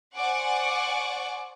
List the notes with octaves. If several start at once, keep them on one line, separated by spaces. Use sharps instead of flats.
C5 D5 F#5 G#5 C#6 D6